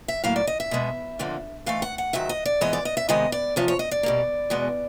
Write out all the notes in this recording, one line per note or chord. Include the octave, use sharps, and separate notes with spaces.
E5
A2 F#3 A#3 F5
D5
D#5
E5
B2 G#3 B3
F2 D3 F3 A#3
G#2 E3 A3 F5
F#5
F#5
G#2 D#3 F#3 E5
D#5
D5
G#2 E3 G#3 B3 D#5
D5
D#5
E5
C3 D#3 G#3 B3 D#5
D5
E2 C3 F3 C#5
C#5
D#5
D5
B2 G3 A#3
E2 B2 G#3 B3